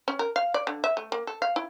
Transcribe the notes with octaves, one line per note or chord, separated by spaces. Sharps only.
C#4
A#4
F5
D5
D3
E5
A3
A#3
A4
F5
E4